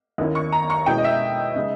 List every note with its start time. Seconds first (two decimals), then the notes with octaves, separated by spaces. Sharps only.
0.18 D#2 D#3 A#3 C#4 E4
0.35 C#6
0.52 A#5
0.70 C#6
0.86 B2 G#3 C#4 E4 G5
0.98 D#5
1.04 E5
1.56 C#3 G#3 D#4